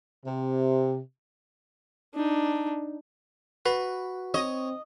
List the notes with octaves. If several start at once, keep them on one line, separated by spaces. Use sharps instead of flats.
C3
D4 D#4
F#4 B4
C4 C#5 D#5